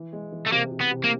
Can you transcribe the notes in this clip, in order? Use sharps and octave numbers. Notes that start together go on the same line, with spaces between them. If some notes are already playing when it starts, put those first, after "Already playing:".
Already playing: E3
G#3
E3
A3
C3 A#3
C3
B3
C3
A#3